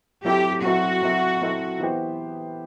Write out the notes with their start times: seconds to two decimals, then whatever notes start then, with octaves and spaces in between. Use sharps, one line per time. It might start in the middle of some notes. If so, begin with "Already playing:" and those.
0.25 F#3 C4 E4 G4 A4 E5
0.64 F#3 C4 E4 F#4 A4 E5
1.02 F#3 C4 E4 A4 E5
1.41 F#3 C4 E4 A4 E5
1.79 E3 B3 E4 G4 C5